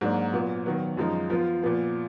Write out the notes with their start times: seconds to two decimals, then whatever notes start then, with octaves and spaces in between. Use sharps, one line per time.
0.01 G#2 F#3 A#3 D4 F#4
0.33 A#2 F#3 B3
0.66 D#3 F#3 B3
0.97 F#2 F3 G#3 D#4
1.30 F3 B3 F4
1.62 A#2 F3 B3